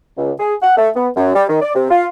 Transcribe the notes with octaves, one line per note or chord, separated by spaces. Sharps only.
C#2
G#4
F#5
A3
B3
F#2
G3
D#3
D5
C3
F4